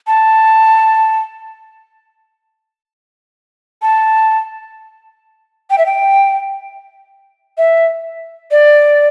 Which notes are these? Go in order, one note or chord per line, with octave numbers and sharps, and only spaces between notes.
A5
A5
G5
E5
G5
E5
D5